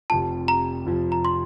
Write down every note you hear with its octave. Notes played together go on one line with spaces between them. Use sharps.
F1 F2 C3 F3 A5
A#5
F1 F2 C3 F3
A#5
C6